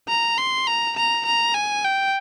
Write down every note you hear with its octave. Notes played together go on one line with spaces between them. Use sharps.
A#5
C6
A#5
A#5
A#5
G#5
G5